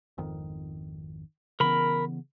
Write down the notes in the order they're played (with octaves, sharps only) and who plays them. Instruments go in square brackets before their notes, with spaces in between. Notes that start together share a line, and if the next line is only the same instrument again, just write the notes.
[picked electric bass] G#1 F2 D#3
[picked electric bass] C#3 E3 B3 [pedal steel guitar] A#4 B5